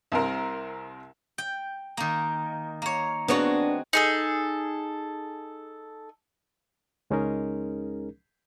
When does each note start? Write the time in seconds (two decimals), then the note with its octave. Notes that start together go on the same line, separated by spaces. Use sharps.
0.12 C2 C3 A#4
1.38 G5
1.97 D#3 A#3
2.82 A#3 C#5
3.28 G#3 B3 C4 D4 F#4 C#5
3.93 D#4 G#4 A4
7.10 C#2 G#3 C#4 D#4 G#4 A#4